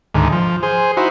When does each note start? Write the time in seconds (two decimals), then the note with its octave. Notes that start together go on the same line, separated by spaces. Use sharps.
0.14 D2 G#2 D#3
0.32 F3
0.63 G#4 C5
0.97 D#4 E4 F#4 C5